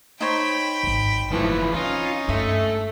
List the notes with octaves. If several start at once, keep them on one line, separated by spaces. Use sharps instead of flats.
D#4 C5 C#5 G5 B5
D#1 G#1
F#1 E3 F3 A3
C4 C#4 D#4 F4
G2 A3 E5